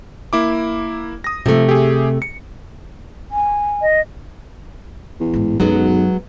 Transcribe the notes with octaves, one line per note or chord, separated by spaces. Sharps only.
A#3 E4 D6
D#6 A#6
C3 F3 A3
G4 G#4
C#7
G#5
D#5
E2
A1 G#2
B1 F#2 F#3 G#3 B3